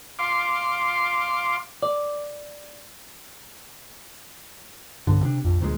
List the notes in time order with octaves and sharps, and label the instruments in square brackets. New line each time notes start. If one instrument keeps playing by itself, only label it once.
[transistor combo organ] F5 C6 D6
[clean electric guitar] D5
[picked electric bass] B1 G2 D3
C3 D4
A#1 F2
D2 A#2 C#3 G#3